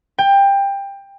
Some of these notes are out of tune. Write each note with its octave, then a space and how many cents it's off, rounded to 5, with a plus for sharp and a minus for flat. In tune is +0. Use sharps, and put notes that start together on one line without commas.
G5 +20